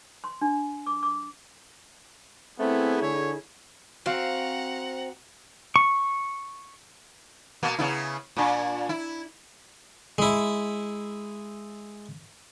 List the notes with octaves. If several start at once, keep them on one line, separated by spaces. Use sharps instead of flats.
C6
D4
D6
D6
A3 B3 C4 E4 G#4
D3 C#5
C4 F#4 F5 F#5 A#5
C#6
B2 A#3
C#3 B3 E4
A#2 D4
E4
G#3 E4